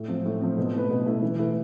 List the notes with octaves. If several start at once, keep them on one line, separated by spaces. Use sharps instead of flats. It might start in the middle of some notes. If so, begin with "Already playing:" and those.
Already playing: A2
F3 C4
A2
F3 C4
B2
A3 E4 B4
B2
A3 E4 B4
E3
A3 E4 B4